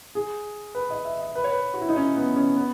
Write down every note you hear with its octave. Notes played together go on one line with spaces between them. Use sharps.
G#4
B4
D#5
E5
D#5
B4
C#5
B4
F#4
E4
D#4
C#4
B3
C#4
B3